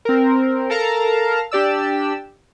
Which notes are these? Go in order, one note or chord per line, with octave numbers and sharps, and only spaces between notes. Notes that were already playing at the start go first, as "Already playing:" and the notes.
C4 A#4
A4 A#4 F5 A5 A#5
D4 G4 D5 E6